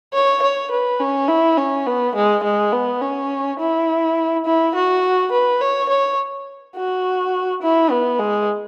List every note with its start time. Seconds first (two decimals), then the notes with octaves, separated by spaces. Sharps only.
0.14 C#5
0.43 C#5
0.71 B4
1.00 C#4
1.28 E4
1.58 C#4
1.86 B3
2.15 G#3
2.43 G#3
2.72 B3
3.01 C#4
3.59 E4
4.45 E4
4.75 F#4
5.32 B4
5.61 C#5
5.89 C#5
6.76 F#4
7.62 E4
7.90 B3
8.19 G#3